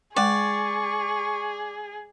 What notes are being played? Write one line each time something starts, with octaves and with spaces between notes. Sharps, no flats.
G#3 G#4 D5 G5 C#6